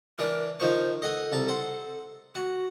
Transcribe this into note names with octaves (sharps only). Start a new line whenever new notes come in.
E3 D4 A#4
D#3 F3 C5 C#6
A4 D#5 F#5 G#5
C2 A5 A#5
C5 F#5
F#4 F#5